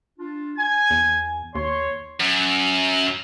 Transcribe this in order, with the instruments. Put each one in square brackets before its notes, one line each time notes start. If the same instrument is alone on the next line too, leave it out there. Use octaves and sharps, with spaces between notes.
[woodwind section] D4 F4
[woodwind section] G#5 [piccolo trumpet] G#6
[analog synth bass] E2
[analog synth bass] D#2 [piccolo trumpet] C#5 [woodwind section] C6
[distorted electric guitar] F#2